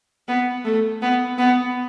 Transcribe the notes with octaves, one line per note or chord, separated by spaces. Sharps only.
B3
A3
B3
B3